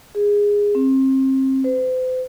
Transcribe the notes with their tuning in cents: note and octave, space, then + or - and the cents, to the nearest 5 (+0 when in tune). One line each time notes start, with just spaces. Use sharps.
G#4 -15
C4 +30
C5 -40